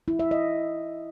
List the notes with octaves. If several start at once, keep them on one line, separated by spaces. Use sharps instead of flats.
E4
E5
D#5